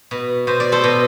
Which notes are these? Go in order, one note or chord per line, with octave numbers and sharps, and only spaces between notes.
B2
B2 C5
D5
A4 C5
B2